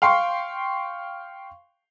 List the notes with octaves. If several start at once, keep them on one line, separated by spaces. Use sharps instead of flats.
F5 G5 C6 C#6